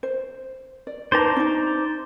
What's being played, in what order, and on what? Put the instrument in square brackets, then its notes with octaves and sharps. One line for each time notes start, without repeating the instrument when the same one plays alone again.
[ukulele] C5
D5
[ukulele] D#4 B4 A5 [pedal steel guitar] C5 D5 A#5
[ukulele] C#4 D#4